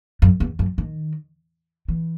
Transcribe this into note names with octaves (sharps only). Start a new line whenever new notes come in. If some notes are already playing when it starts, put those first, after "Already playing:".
F#2
E2
F#2
D#3
E3